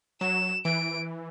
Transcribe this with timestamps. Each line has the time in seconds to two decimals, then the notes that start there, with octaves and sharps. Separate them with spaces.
0.21 F#3 E7
0.65 E3 D7